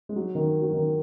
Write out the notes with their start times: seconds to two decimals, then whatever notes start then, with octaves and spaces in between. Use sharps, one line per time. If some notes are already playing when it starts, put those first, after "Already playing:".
0.09 G#3
0.16 F#3
0.35 D#3
0.62 F#3
0.73 D#3